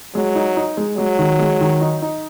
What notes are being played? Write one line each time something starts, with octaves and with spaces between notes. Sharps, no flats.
F#3 G#3
D#4
D#4
G#3
F#3 G#3
D#3
G#3
D#3
D#4
D#4